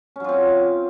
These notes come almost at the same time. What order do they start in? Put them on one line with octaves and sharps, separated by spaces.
C#4 F#3 F4 C4